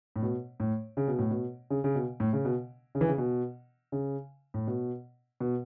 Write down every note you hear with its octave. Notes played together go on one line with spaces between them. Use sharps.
A2
B2
A2
C#3
B2
A2
B2
C#3
C#3
B2
A2
C#3
B2
C#3
E3
C#3
B2
C#3
A2
B2
B2